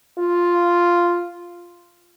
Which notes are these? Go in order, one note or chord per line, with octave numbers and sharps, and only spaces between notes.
F4